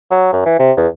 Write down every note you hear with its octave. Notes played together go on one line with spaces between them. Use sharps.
F#3
F#2
E3
C3
E2